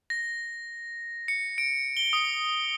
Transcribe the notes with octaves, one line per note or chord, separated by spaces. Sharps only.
A#6
C#7
D7
G7
D#6